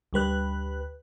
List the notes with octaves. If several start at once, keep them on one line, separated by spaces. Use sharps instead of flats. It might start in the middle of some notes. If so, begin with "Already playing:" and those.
D2 G3 B4 F#6